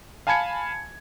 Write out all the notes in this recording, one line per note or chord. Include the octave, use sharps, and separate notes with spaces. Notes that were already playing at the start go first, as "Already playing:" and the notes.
F5 G#5 A5 B5 G#6 C#7